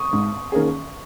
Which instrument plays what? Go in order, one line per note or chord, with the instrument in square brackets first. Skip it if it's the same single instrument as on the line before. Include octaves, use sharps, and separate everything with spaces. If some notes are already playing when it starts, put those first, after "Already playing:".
Already playing: [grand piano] C#6 D#6
[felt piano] G#2
D#3 A#3 C#4 G#4